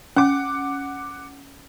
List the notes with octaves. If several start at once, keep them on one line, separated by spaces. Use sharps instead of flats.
C#4 F#5 D6